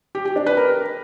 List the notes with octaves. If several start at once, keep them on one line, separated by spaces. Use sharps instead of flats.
G4
G4
D4
B4
A#4